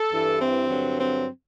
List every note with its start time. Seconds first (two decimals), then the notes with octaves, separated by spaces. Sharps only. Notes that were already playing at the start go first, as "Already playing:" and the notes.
Already playing: A4
0.11 G2 E3
0.40 C4
0.69 G2 D3 F#3
0.98 C4